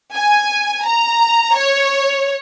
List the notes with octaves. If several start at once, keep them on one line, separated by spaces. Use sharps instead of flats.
G#5
A#5
C#5